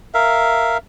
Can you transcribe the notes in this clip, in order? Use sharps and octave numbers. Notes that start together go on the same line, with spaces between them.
A#4 E5 F5